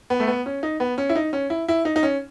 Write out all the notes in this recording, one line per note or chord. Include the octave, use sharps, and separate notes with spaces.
B3
A3
B3
C#4
D#4
B3
C#4
E4
D#4
C#4
E4
E4
D#4
D#4
C#4